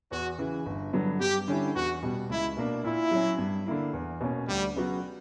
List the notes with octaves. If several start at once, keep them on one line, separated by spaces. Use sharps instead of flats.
E2 F#4
C#3 E3
G1
G2 D3 F#3 B3
G2 G4
D3 G3 C#4 E4
E2 F#4
B2 G3
C#2 E4
B2 A#3 D4
A#2 E4
F#3 C#4
G2
D3 A#3 E4
E2
B2 A#3 C#4
D2 G3
C#3 F#3 B3 F#4